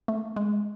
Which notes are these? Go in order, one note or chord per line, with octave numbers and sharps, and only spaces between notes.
A3
G#3